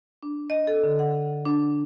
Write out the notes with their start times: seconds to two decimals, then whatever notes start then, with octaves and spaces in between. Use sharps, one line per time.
0.23 D4
0.50 D#5
0.67 A4
0.84 D3
0.99 F#5
1.45 D4